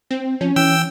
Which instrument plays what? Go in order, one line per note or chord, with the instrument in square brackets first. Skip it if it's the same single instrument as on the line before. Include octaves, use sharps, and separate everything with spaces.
[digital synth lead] C4
[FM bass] F3 [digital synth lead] C#4
[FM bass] E3 [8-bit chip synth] G5 E6